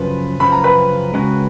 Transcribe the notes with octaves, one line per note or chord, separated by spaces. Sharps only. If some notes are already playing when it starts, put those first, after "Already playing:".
Already playing: F#2 C#3 F3 B4
F#2 C#3 F3 B5
A#5
B4 B5
C#3 G#3 C#4 F#4